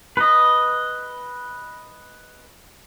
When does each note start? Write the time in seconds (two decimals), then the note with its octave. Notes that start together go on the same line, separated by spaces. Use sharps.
0.17 B4 D#5